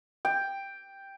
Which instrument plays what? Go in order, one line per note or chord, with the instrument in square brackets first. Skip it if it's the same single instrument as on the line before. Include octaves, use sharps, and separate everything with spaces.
[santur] G5